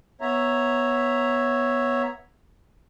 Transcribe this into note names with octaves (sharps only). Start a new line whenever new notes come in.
B3 C#5 E5 A#5